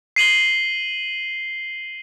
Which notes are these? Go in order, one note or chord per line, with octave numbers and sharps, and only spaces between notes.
C7 D#7 F#7 G7